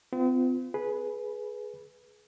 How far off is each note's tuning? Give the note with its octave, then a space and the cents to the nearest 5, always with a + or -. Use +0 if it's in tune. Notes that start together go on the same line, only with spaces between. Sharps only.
C4 -45 F4 -10
G#4 +20 B4 -10